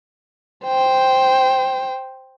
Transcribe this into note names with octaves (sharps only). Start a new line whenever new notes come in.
C5 G5